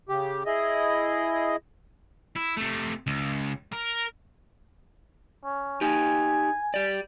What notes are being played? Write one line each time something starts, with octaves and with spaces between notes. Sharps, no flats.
C#3 G4
E4 G#4 D#5
E4
C3 A3
C#2
A#4
C#4
D#4 G4 G#5
G4 D5